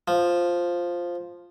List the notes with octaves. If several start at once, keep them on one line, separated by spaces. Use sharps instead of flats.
F3